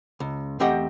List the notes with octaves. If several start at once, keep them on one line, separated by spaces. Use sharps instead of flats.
C#2
E2 A3 C4 G4 D#5 F#5